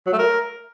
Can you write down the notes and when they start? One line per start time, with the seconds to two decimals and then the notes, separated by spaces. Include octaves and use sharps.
0.06 F#3
0.12 A3
0.19 A#4